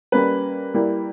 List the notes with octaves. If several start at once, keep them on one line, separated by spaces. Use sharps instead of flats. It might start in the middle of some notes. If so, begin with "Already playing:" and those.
G3 A#3 C#4 B4
G3 A#3 E4